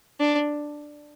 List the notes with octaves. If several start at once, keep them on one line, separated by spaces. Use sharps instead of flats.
D4